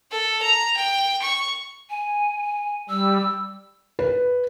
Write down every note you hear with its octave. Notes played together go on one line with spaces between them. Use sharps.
A4
A#5
G5
C#6
G#5
G3 E6
B4